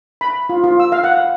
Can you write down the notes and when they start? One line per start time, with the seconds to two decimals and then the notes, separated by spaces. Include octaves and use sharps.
0.21 B5
0.49 F4
0.64 F4
0.80 E6
0.92 F5
1.04 F#5
1.17 F5